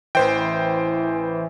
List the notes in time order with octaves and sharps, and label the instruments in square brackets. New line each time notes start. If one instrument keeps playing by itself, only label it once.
[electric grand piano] A1 C5 G5 [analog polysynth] E3